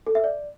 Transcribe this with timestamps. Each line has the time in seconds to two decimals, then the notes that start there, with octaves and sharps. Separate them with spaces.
0.07 A4
0.15 E5
0.24 D5